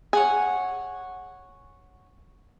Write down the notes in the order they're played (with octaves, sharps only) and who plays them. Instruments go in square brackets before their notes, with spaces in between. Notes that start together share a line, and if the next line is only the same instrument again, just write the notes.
[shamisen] G#4 [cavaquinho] C#5 F#5 G#5